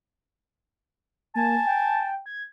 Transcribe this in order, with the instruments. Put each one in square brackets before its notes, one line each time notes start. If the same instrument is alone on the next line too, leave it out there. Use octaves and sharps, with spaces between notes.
[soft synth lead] A#3 [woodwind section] G#5 A5
[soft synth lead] G5
G#6